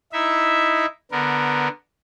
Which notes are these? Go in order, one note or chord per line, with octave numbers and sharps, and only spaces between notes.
D#4 E4 E5
D3 B3 A#4